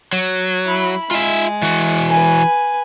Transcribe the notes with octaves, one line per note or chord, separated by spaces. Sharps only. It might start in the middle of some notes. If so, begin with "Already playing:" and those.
F#3
E4 B5
G#3 F4 E5
E3 F#4
B4 G#5